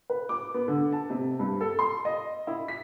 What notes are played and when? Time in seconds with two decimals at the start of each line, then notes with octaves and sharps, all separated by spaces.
0.10 B4
0.29 D6
0.54 B3
0.68 D3
0.92 A5
1.10 C3
1.39 G2
1.61 A4
1.79 C6
2.05 D#5
2.47 E4
2.68 B6